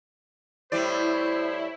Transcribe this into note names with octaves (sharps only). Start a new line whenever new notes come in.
A2 G3 E4 C5 D5